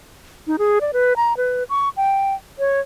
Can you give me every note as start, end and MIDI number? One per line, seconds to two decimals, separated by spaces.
0.47 0.56 63
0.59 0.79 68
0.81 0.91 74
0.93 1.14 71
1.16 1.36 82
1.37 1.64 71
1.69 1.89 85
1.97 2.34 79
2.59 2.80 73